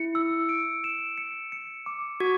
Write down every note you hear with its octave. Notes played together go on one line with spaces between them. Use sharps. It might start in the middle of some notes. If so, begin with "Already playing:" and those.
Already playing: E4 C#7
E6
D7
E7
C#7
C#7
D6
F#4 G#6